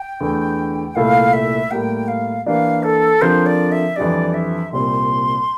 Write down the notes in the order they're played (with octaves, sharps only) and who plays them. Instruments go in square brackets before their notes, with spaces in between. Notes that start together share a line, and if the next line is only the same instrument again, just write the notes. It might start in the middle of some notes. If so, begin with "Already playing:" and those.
Already playing: [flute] G5
[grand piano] E2 D3 A3
[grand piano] C2 A#2 A3 E4 A4 [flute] F5
[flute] E5
[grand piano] A2 G3 A#3 [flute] G5
[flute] F5
[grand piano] E3 A#3 D4 G4 D5 [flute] F5
[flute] A4
[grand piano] D3 F3 C4 G4 A#4 [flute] C5
[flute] D5
E5
[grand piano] F2 E3 G3 D4 [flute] D5
[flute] E5
[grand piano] C2 A#2 G3 C4 [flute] C6